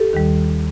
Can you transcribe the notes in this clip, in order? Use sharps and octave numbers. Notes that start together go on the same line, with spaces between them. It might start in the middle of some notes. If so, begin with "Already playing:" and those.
Already playing: G4 A4
D#2 D#3 G3